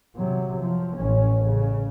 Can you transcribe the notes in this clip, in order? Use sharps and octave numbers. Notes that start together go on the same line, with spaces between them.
C3 F#3
F3
A1 C#4
C#3